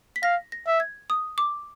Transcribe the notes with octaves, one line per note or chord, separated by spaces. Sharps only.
B6
F5 A#6
A#6
E5
G#6
D#6
D6